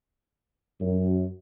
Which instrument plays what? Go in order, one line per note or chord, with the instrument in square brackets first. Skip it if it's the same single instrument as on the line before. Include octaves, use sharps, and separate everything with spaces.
[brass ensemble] F#2